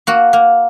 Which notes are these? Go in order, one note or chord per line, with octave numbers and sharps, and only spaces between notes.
A#3 F#4
A#3